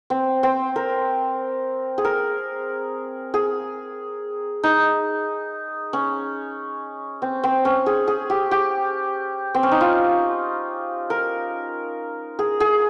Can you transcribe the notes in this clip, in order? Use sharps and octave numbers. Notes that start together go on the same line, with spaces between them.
C4
C4
A#4
G#4
A#4
G#4
D#4
C#4
C4
C4
C#4
G#4
G#4
G4
G4
C4
C#4
D#4
F4
A#4
G#4
G#4